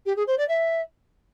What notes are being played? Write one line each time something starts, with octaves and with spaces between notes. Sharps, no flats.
G4
G#4
C5
D5
E5